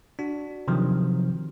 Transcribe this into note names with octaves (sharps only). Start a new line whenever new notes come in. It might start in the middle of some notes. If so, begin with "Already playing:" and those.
D4 F#4
C3 D#3 F3 F#3